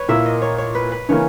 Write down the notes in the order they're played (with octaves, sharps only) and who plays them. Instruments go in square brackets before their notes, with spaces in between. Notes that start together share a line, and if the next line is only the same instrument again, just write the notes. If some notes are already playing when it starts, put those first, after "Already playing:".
Already playing: [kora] B4 C#5
[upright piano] A#2 A#3 E4 A#4 [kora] E5
[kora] D#5
C#5
C#5
B4
B4
[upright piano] C#3 E3 A#3 C#4 [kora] C#5